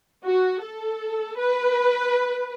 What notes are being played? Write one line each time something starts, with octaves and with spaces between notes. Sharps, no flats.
F#4
A4
B4